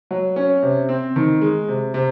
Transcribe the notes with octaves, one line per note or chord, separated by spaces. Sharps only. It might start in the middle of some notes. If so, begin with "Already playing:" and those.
F#3
C#4
C3
C4
D#3
G#3
C3
C3